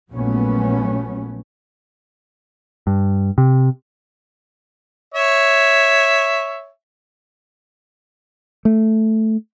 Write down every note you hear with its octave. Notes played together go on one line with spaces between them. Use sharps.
A#1 A#2 F#3 A3 B3 C#4
G2
C3
C#5 E5
A3